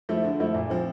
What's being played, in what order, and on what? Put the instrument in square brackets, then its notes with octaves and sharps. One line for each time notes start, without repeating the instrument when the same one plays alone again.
[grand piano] F3 A3 E4
D3
F3 A3 E4
A#2
F3 C4